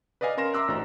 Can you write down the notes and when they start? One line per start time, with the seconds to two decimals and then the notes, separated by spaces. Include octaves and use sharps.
0.21 B4 D5 D#5 F5 G#5
0.37 C#4 A#4 C6 A#6 E7
0.54 E5 A#5 C6 D6 E6 F#6
0.68 A1 D4 F#4 A4 C5 A#5